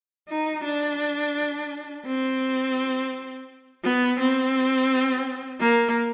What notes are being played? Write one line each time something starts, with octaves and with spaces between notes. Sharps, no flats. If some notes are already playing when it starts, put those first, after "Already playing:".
D#4
D4
C4
B3
C4
A#3